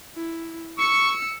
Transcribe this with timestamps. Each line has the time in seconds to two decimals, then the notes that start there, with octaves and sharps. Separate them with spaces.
0.16 E4
0.79 C#6 E6 C#7